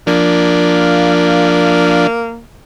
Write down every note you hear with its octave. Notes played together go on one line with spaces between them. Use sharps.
F3 A#3 D4